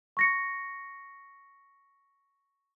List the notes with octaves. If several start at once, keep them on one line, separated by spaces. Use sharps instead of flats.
C#6 A#6 C#7